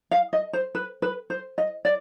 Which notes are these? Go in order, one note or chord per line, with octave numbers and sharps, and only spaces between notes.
F5
D#5
C5
B4
B4
C5
D#5
D5